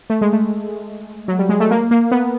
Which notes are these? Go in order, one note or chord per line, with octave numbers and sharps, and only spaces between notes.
A3
G#3
A3
F#3
G3
G#3
A3
A#3
A#3
B3